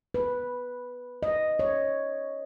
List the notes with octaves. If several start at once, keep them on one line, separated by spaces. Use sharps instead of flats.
B4
D#5
C#5